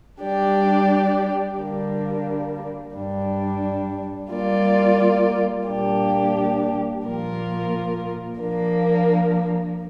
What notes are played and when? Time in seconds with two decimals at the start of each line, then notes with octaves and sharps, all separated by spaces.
0.22 G3 D4 G4 D5
1.58 D3 G3 A#3 D4
2.95 G2 G3 D4
4.31 G3 A#3 F4 D5
5.68 A#2 G3 A#3 D4 G4
7.04 A#2 F3 A#3 F4 A#4
8.40 F3 A#3 D4